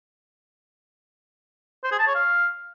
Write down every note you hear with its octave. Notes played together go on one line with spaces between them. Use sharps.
C5
G#4
A5
C#5
F5